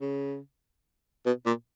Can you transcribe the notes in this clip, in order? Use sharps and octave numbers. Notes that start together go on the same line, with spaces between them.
C#3
B2
A#2